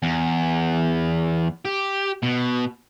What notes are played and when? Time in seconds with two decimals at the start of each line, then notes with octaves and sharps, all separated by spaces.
0.03 E2
1.65 G4
2.23 B2